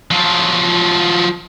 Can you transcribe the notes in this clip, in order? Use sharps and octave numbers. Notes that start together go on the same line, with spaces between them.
F3 F#3